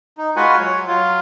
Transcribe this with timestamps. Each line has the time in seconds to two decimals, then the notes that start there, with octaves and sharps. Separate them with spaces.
0.18 D#4
0.36 G#3 F4 F#4 B4 F#5 G#5
0.60 F#3 C#5
0.88 F#3 F4